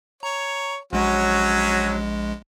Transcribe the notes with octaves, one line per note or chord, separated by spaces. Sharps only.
C#5 A#5
A#1 F#3 G#3 C#4 F#4